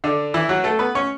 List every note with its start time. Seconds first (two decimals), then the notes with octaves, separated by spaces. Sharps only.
0.04 D3 D4
0.34 E3 E4
0.49 F#3 F#4
0.64 A3 A4
0.79 B3 B4
0.95 C#4 C#5